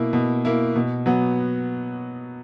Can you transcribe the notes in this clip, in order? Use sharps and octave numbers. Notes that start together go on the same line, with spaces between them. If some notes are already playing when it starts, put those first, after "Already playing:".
Already playing: B2 A#3 E4
B2
A#3 E4
B2
F#3 B3